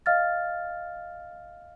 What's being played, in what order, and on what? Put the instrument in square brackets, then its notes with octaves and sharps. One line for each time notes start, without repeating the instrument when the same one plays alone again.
[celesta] D#5 F5 F6 A6